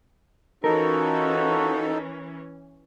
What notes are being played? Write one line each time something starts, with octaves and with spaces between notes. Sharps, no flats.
E3 C#4 D#4 F4 F#4 A4 A#4